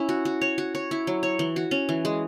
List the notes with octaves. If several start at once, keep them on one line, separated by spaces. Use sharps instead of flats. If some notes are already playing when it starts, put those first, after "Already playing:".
Already playing: C#4 E4
F#4
F#4
C#5
F#4
C#5
E4
F#3
C#5
E3
F#4
C#4
E3
G#3